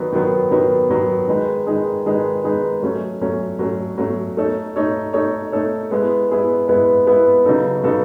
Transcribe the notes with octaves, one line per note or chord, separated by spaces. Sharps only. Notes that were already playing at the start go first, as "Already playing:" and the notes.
Already playing: D#3 F#3 B3
D#3 F#3 B3
D#3 F#3 B3
D#3 F#3 B3
D#3 G#3 D#4 G#4 B4
D#3 G#3 D#4 G#4 B4
D#3 G#3 D#4 G#4 B4
D#3 G#3 D#4 G#4 B4
F#3 A3 C#4
F#3 A3 C#4
F#3 A3 C#4
F#3 A3 C#4
A3 D#4 A4 C#5
A3 D#4 A4 C#5
A3 D#4 A4 C#5
A3 D#4 A4 C#5
G#3 B3 E4 G#4 B4
G#3 B3 E4 G#4 B4
G#3 B3 E4 G#4 B4
G#3 B3 E4 G#4 B4
C#3 F#3 B3 D#4 A4
C#3 F#3 B3 D#4 A4